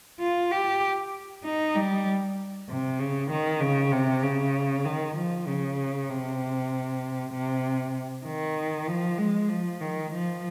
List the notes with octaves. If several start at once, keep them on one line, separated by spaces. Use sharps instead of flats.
F4
G4
D#4
G3
C3
C#3
D#3
C#3
C3
C#3
D#3
F3
C#3
C3
C3
D#3
F3
G#3
F3
D#3
F3